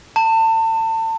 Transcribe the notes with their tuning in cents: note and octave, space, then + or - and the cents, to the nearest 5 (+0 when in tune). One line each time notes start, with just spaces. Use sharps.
A5 +35